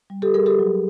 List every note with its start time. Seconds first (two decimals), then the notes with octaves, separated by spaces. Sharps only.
0.10 G3
0.22 G4 A4
0.34 G3 G#4 A#4
0.46 G4 A4
0.59 F#3